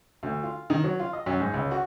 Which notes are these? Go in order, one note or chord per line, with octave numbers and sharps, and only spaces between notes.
D2
F4
D#3
F#3
F4
D#5
F#2
G#2
C#2
F#4